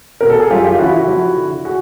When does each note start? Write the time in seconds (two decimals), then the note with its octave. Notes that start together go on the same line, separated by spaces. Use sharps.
0.21 B2 A#4
0.30 A4
0.40 G#4
0.50 F#2 F4 G4
0.64 F4 G4
0.79 C#3 E3 E4 F#4
0.87 G4
0.93 E4 F#4
1.08 F2
1.36 D3
1.65 F#4 G#4